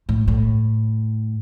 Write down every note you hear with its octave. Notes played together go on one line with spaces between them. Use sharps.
A2
A2